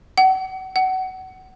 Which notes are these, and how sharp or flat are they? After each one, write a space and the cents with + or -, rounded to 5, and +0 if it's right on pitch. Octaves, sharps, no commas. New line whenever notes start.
F#5 +35
F#5 +25